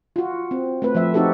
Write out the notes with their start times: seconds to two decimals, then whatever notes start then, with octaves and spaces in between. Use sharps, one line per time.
0.16 F4 F#4
0.51 C4
0.82 A3 C4 B4
0.95 F3 A3 E5
1.14 C4 D#4 F#4 G4 A4